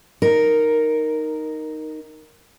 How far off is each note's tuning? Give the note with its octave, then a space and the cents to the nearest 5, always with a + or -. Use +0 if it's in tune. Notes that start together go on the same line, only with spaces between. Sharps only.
D#4 +0 A#4 +0